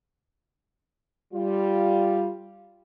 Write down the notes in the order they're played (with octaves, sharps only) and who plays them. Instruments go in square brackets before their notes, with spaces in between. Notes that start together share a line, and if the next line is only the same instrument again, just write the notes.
[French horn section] G3 F4